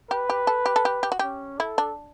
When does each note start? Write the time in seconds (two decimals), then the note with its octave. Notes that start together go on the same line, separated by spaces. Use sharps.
0.10 G4 B4
0.30 G4
0.47 A4
0.66 G4
0.76 A4
0.85 G4
1.03 G4
1.12 F#4
1.19 C#4 G4
1.59 E4 A4
1.78 D4